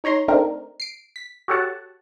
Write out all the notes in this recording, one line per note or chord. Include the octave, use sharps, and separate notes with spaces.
D#4 C#5 A#5 C6
A3 C4 D4 D#4 A#4
C7 D7
B6
F#4 G4 A4 C#5 F#5 A5